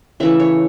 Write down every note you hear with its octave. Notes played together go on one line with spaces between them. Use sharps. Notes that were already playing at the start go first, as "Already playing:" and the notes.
C#3 E3 A3 E5
C#5